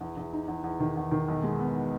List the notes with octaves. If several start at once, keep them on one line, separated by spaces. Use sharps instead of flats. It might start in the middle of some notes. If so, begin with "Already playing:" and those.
E2
E2
D#4
E2
E2
D#3
E2
D#3
B1
G#3
B3